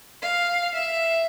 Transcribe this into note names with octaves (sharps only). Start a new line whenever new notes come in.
F5
E5